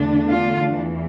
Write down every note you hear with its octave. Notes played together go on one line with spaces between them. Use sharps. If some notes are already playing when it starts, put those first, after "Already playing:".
Already playing: E2 D3 A3 D4
F4
E2 E3